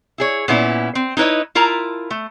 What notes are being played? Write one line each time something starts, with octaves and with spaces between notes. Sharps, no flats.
E4 G#4 C#5
A#2 B3 C#4 E4
C4
D#4 E4 B4 C#5 D#5
E4 F4 A#4 A5 A#5
A3